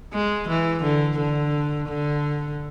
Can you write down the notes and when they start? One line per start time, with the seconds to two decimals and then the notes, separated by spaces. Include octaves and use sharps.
0.13 G#3
0.49 E3
0.83 D3
1.18 D3
1.89 D3